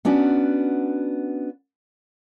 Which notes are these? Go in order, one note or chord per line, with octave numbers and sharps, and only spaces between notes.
B3 C#4 D4 F#4